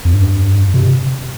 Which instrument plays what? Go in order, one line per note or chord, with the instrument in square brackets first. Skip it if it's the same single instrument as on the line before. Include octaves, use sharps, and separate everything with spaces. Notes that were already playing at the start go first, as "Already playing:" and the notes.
[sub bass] F2
G2
C3